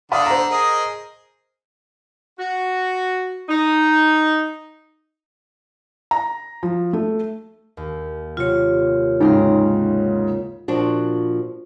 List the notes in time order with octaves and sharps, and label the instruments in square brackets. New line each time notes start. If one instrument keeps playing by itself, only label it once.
[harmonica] D3 D4 [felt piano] F5 B5 D#6
[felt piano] C5 A#5
[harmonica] G#4 A#4 D#5
[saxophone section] F#4
D#4
[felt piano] A#5
F3
A3
[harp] D#2
[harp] C3 F#3 [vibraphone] F4 C#5
[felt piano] G#2 C#3 [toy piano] D#4 [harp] G5 A#5 C6
[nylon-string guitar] A#2 F3 D4 F#4